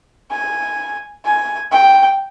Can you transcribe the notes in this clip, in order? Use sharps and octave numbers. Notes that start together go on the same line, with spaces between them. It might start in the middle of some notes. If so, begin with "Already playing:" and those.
G#5
G#5
G5